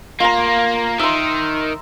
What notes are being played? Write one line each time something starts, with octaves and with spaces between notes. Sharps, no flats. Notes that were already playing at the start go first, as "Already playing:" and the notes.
A#3 F4 A#5
D#3 E5 C6